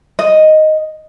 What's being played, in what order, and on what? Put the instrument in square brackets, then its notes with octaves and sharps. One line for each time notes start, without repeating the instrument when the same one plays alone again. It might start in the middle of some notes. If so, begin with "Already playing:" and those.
[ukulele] D#5